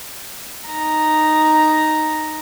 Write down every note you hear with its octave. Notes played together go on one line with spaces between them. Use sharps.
D#4 A#5